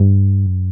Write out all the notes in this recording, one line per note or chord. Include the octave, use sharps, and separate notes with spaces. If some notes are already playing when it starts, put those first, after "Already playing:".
Already playing: G2
F#2